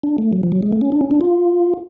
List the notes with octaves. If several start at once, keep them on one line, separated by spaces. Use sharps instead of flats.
D4
A3
F#3
F3
F#3
G#3
A3
C#4
D4
C#4
D4
F4